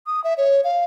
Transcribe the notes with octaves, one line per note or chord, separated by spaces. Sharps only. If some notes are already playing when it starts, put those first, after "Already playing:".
D#6
E5
C#5
F5